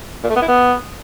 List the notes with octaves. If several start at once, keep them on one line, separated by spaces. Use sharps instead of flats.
A#2
A3
B3
E4
B3